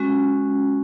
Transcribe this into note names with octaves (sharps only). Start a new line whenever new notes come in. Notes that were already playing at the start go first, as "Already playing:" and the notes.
Already playing: G#3 C#4 F#4